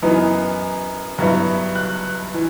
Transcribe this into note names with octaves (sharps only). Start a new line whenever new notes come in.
F#2 E3 B3 D#4
G2 F#3 B3 E4
F#6
E3